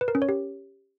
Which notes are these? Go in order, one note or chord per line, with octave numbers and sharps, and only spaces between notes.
B4
A#4
C#4
C#5
G4